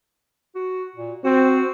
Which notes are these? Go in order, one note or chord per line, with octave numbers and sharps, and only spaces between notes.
F#4
A#2
C4 F#4